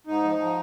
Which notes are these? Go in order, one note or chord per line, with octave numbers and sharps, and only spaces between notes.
G#2 D#4
F3
F3